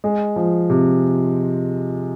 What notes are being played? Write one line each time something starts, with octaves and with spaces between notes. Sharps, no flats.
G#3
F3
C3